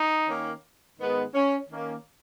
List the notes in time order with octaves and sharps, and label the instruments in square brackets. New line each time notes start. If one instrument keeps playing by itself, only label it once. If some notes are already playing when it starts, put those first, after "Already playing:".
Already playing: [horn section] D#4
D#3 A#3 C#4
G#2 D#3 G#3 B3
C#4
D#3 A#3 C#4